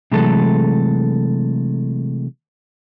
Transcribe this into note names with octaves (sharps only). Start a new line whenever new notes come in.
C3 E3 F#3 G#3 A3 A4